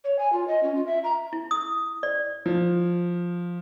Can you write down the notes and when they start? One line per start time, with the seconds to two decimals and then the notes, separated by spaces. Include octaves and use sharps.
0.04 C#5
0.19 G#5
0.33 F4
0.48 D#5
0.63 C#4
0.75 F4
0.86 E5
1.04 A#5
1.33 E4
1.51 D#6
2.03 D5
2.46 F3